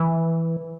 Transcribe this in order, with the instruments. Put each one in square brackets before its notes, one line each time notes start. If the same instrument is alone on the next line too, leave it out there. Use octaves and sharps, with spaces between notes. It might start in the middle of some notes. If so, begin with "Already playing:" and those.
Already playing: [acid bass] E3